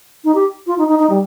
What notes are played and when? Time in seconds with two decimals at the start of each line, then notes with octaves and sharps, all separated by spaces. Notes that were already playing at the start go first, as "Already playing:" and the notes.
0.25 D#4
0.35 G4
0.67 F4
0.78 D#4
0.88 D#4
0.99 D#4
1.10 G3